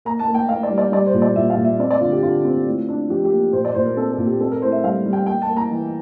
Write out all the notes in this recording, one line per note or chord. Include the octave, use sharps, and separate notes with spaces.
A#3 A#5
A5
A#3
G5
A#3 F5
D5
G3
D5
G3 D5
C5
A#2
D5
A#2 E5
F5
A#2
E5
C4 D5
D5
D3 F4
G4
D3 F4
C4
A2
D4
F3 G4
G4
A#3
A#2 C5
D5
A#2 C5
A#4
C4 A4
A4
A#2
G4
C4 A4
A#4
A2 C5
E5
G3 F5
G3
G5
A#3 G5
A5
A#3
A#5
E3